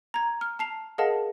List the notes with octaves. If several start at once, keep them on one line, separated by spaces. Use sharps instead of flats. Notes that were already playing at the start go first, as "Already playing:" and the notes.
A#5 G#6
F6
A5 C7 F7
G#4 A#4 D#5 F5 F#5 A5